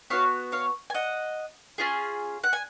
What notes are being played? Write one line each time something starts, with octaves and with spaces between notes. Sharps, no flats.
B3 F#4 C#5 F5
C#5 F5
G#5
D#5 F#5
C#4 F4 G#4
F#5
G#5